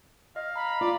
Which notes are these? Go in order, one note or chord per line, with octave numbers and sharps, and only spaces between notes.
D#5 F5
A#5 B5
F4 D5